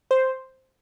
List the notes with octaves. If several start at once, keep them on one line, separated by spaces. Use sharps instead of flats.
C5